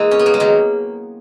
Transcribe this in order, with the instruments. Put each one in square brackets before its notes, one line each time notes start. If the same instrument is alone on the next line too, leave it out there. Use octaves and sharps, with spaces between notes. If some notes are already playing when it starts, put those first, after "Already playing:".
Already playing: [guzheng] E3 G#3 A#3
C#4
B3
A#3
G#3
D#3 F#3